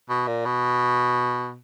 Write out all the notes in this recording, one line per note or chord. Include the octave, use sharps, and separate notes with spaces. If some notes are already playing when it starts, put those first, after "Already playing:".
B2
A#2
B2